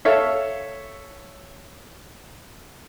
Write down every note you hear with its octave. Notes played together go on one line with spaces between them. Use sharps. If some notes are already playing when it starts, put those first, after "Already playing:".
A4 C#5 E5 F5